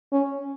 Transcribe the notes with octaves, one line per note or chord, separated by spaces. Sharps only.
C#4